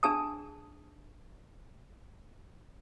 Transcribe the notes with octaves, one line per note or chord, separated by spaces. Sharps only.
D4 G#4 A5 D#6